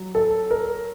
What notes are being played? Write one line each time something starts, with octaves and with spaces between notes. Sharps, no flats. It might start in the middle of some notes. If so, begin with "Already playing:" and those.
Already playing: F#3
A4
A#4